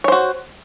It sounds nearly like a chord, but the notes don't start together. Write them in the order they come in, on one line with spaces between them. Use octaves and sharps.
C#5 C5 F#4